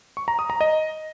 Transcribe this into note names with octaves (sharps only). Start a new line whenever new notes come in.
C#6
A#5
D#6
A#5
D#5